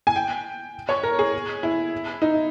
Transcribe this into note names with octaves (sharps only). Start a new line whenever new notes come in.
G#5
G5
C#5
A#4
G#4
E4
D#4